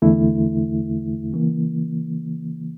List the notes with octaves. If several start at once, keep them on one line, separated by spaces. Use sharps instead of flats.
E2 D3 A3 E4
C#3 E3 A#3